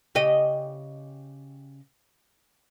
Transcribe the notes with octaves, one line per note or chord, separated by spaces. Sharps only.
C#3 G4 D#5